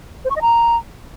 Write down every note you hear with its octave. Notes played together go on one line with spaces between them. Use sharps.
C5
C#6
D#5
A#5